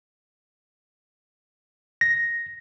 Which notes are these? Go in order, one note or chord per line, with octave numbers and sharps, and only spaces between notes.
A#6